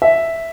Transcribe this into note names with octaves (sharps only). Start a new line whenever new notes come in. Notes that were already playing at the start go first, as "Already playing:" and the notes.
E5